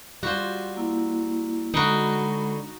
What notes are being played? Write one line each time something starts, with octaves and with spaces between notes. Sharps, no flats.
G3 F4 F#4 C5
A#3 E4
D3 G#3 D#4 F#4 B5